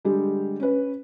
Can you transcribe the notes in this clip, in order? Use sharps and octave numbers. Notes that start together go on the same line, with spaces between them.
D3 G3 G#3 G4
C#4 B4